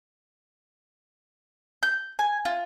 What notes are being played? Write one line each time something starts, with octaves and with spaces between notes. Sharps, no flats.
G6
G#5
F4